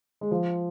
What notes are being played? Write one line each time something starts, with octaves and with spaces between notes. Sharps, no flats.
G#3
F3